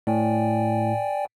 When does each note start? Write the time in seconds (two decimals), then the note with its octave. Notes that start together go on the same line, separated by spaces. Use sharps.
0.07 A2 D5 G5 G#5